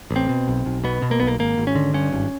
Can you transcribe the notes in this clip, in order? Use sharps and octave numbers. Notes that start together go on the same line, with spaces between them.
A1
C4
B2
B1
B1
B2 B3
B2
A#3
B1 B3
A#3
G#1 A#3
G#1
C#4
D3
G2 C#4
G#1